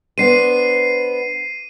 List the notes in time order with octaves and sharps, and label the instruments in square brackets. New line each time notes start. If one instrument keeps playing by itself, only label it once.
[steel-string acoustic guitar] B3 D4 C5 [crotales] C7 D#7